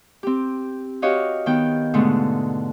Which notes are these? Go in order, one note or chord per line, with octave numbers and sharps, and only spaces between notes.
C4 G4
F#4 G4 C#5 D#5 F5
D#3 B3 G5
G#2 B2 D3 G#3 A3